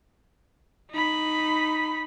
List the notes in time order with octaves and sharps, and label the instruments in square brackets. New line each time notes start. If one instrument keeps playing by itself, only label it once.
[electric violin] D#4 B5